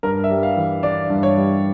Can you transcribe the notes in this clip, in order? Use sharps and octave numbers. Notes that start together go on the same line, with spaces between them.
G2 A#4
E5
G3
F5
E3
D4 D5
G2
C#5
G3